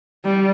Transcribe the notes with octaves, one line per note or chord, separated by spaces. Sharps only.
G3